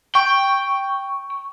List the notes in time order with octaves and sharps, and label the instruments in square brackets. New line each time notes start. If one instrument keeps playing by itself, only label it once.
[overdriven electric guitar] G5 [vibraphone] C#6